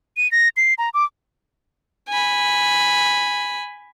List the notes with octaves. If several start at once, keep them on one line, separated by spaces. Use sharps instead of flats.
D#7
A#6
C7
A#5
D6
G#5 B5